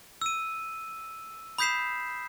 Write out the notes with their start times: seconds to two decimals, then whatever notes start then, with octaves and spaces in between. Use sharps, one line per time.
0.22 E6 D#7
1.58 B5 D#6 G6 B6 C7 E7